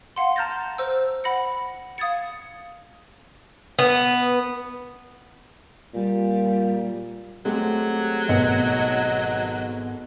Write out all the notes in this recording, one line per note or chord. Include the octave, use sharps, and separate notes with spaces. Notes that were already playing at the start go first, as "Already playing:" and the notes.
F5 F#5 C6
A5 A#5 F6 G6 A6 A#6
C5 E6
F#5 B5 A#6 C#7
F5 D#6 G#6 A6 C#7
B3
A#2 G3
F#3 G#3 A3 C4 G4
G#1 B2 D#5 C#7